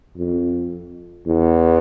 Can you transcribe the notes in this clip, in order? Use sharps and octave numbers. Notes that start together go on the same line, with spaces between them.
F2
E2